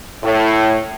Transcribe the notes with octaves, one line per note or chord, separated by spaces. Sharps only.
A2